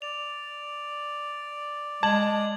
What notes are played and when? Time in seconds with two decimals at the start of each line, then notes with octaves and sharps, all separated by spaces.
0.02 D5 F7
2.03 G#3 A5 G#6 F#7